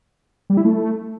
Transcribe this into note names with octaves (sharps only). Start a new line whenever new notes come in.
G3
E4
A3